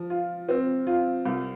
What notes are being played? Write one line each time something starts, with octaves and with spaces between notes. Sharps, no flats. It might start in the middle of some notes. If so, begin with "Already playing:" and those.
Already playing: F3
F4
C4
F4
C2